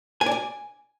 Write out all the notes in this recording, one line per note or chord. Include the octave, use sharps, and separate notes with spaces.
G#5
D5
G#5